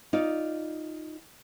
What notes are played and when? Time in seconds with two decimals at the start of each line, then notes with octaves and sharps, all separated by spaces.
0.13 D#4 F4 D5